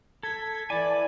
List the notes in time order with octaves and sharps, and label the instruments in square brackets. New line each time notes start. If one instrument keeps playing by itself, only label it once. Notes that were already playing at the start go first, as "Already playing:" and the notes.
[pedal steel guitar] A4 [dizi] G#6 [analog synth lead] B6
[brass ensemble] E3 [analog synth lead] D5 [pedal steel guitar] G#5 A5 [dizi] B5